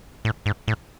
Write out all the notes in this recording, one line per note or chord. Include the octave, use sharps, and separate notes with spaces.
A2
G#2
A2